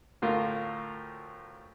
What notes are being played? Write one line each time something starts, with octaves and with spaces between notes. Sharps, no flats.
D2 A2 F4 A#4